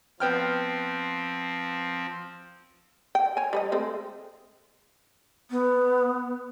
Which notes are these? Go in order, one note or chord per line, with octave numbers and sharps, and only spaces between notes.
F3 B3 C4 G5 F6
G5
C#5 G#5
G3 B4 D#5
G#3 A3 C4
B3